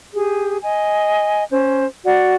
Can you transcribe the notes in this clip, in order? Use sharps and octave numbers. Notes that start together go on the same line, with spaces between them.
G4 G#4
D#5 G#5
C#4 C5
F#4 D5 F#5